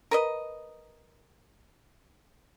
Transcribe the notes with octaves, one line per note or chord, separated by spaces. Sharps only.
A#4 B4 D#5